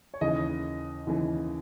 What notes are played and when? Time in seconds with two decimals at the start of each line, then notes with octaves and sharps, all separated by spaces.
0.14 C#5
0.21 D#2 C#3 E3 D#5
1.07 D#2 C#3 E3